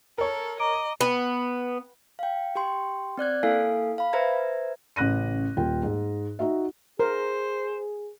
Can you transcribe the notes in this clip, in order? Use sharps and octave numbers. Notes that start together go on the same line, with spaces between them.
A4 A#4 C#5
D#5 A#5 D6 D7
B3
F5 G5
G4 G5 C6
C4 D5 F#6 G#6
A#3 E4 A4 F5 G#5 C7
F5 B5
B4 C5 E5 A#5 G#6
A1 C#3 F#6 A#6 D#7
D#1 F4 G5
G#2
D#4 F#4 E5
G#4 A#4 C5